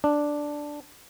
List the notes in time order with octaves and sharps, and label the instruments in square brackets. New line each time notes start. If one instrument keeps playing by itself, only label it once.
[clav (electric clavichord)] D4